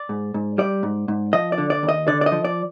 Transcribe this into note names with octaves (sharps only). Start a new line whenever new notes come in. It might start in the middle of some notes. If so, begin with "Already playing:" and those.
Already playing: D5
G#2
G#2
G3 D5
G#2
G#2
F3 D#5
D5
D3
D5
D#2
D#5
D3 D5
D5
D#5
F3
D5